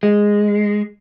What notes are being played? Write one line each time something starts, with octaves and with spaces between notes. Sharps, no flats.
G#3